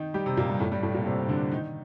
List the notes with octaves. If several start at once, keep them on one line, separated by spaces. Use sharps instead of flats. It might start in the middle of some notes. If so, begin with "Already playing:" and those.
Already playing: D#3 D#4
G3 G4
C3 C4
A#2 A#3
G2 G3
A2 A3
G2 G3
A2 A3
A#2 A#3
C3 C4
D3 D4
D#3 D#4